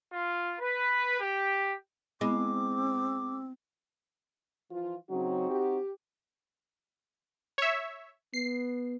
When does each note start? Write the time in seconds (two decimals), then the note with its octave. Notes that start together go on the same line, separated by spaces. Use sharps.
0.12 F4
0.60 B4
1.20 G4
2.21 G#3 B3 C4 E4 B5 D6
4.71 E3 F3 F4
5.10 C#3 F#3 C4 D#4 F#4
5.50 G4
7.58 C#5 E5
8.34 B3 C7